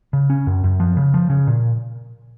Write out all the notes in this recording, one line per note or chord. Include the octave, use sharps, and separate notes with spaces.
C#3
C#4
F#2
F#2
F3
C#3
F3
C#3
A#2